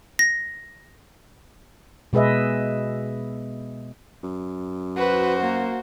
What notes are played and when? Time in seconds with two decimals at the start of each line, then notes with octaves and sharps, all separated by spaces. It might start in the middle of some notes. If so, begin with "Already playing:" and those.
0.19 A#6
2.13 B2 G#3 G#4 B4 D#5 E5
4.23 F#2
4.97 F#4 B4 C5
5.42 A#3